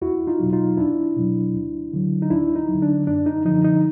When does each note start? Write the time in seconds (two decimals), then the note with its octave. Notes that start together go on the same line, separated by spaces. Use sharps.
0.02 E2 E4 F#4
0.27 D#4 F4
0.40 B2 F#3
0.53 D#4 F4
0.77 E2 D4 E4
1.17 B2 F#3
1.54 D2
1.93 D3 F#3
2.22 D#4
2.30 D2 D4 E4
2.56 D#4
2.68 F#3
2.74 D3
2.82 D4
3.07 F#2 D4
3.26 D#4
3.45 D3 F3 D#4
3.65 D#4